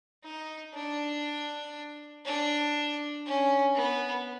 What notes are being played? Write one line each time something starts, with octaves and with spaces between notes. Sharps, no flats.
D#4
D4
D4
C#4
B3